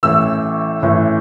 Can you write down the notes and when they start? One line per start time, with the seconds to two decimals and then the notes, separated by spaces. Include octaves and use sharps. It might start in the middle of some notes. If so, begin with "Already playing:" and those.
0.03 A1 A2 E3 E6
0.82 A1 A2 E3